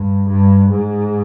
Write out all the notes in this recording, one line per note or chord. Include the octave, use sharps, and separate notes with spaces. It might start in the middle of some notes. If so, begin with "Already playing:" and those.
Already playing: G2
G2
G#2